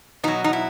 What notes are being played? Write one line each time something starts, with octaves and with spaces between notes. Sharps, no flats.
B2 F#3 D#4
D#4
E4